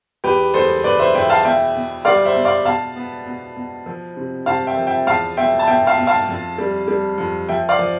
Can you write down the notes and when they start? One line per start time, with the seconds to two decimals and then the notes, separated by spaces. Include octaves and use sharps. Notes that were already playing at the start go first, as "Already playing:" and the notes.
0.24 E2 G4 B4
0.54 E2 A4 C5
0.84 E2 B4 D5
0.99 C5 E5
1.15 E2 E5 G5
1.30 F5 A5
1.45 B2 E5 G5
1.76 B2
2.05 G3 D5 F5
2.25 C5 E5
2.35 B2
2.45 D5 F5
2.65 B2 F5 A5
2.96 B3
3.26 B2
3.56 B2
3.86 F3
4.17 C3
4.46 C3 F5 A5
4.67 E5 G5
4.77 F3
4.87 E5 G5
5.07 E2 F5 A5
5.37 B2 E5 G5
5.59 A5
5.67 B2 E5 G5
5.87 F5 A5
5.98 B2
6.07 F5 A5
6.28 F2
6.58 G3
6.88 G3
7.18 F2
7.49 F3 E5 G5
7.69 D5 F5
7.79 F3